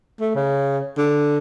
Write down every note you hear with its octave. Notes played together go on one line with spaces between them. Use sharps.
A3
C#3
D3